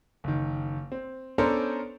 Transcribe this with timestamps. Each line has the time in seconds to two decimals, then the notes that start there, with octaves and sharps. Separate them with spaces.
0.24 F#1 D#3
0.92 C4
1.38 B3 C#4 D4 A4 A#4 C5